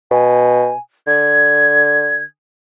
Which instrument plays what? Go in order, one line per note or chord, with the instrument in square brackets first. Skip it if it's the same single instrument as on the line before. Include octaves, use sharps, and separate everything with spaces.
[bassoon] B2 [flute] G#5
[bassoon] D3 [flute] G#6